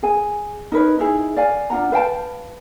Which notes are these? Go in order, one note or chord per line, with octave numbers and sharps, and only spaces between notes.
G#4 G#5
D#4 A#4 B4 C#5
D#4 E4 G#4
D5 F5 G#5
D4 F4 F#5 A#5
B4 F5 G5 A5